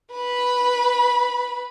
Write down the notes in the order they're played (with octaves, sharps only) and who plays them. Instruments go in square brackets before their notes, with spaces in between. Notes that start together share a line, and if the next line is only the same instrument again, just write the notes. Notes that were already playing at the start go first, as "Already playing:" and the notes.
[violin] B4 B5